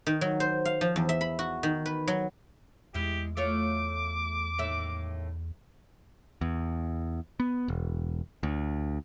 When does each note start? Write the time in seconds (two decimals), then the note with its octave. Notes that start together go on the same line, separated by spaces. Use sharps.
0.07 D#3
0.21 F#3
0.40 C5
0.65 F5
0.81 F3
0.96 E2
1.09 E5
1.21 B5
1.39 F#4
1.63 D#3
1.86 B4
2.08 F#3
2.94 E2 G#3 E4 G4
3.37 A3 F4 C#5 D6
4.58 D#2 A2 E5
6.41 E2
7.40 B3
7.68 E1
8.43 D2